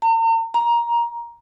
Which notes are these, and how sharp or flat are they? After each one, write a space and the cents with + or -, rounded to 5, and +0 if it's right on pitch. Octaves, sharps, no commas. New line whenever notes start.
A#5 -45
A#5 +15